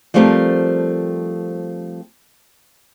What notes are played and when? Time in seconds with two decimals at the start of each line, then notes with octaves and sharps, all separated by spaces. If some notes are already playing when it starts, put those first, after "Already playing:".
0.14 F3 G3 A3 C4 G4 A#4